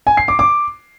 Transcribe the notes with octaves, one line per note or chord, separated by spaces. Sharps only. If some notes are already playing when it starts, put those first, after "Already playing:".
G#5
C7
D6
D6